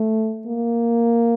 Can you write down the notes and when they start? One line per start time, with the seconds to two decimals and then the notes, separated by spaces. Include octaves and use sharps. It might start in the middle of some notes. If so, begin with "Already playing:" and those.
Already playing: A3
0.46 A#3